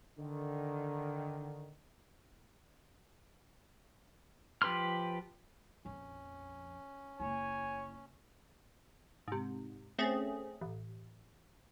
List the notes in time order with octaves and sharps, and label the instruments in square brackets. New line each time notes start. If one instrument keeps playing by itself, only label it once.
[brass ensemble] D3 D#3
[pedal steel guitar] F3 G4 B4 C6 F6
[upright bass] A#1 F2 [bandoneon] C#4
[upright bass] F#1 E4 [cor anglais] C#5 [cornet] G#5
[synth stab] G#2 C3
A3 C4 C#4 G#4
A1